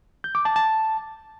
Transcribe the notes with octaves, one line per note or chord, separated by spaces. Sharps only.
G6
D6
A5
A5